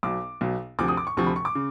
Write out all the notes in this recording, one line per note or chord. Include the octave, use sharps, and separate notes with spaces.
B1 B2 D6
B1 B2
D2 C3 F3 D6
D#6
D6
C#6
D2 C3 F3 C#6
B5
C#6
D6
C#3